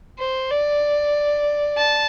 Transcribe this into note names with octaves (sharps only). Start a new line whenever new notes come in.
C5
D5
A5